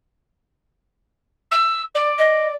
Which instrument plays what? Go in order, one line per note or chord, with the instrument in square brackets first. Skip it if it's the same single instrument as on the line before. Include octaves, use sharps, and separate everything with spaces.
[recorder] E6
D5
[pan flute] D#5